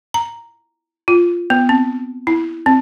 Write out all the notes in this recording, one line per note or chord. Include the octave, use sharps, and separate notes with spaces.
A#5
F4
B3
C4
E4
C4